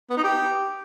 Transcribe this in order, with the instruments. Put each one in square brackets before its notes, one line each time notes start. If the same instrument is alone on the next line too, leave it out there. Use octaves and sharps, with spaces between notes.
[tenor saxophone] B3
D#4
G4